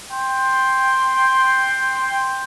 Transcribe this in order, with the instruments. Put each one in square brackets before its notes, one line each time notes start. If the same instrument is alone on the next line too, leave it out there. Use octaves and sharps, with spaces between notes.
[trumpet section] G5 C6